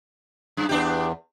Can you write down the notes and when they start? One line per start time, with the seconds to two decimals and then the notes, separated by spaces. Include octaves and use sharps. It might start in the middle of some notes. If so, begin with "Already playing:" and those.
0.57 F#2
0.69 E2 B3 D4 G4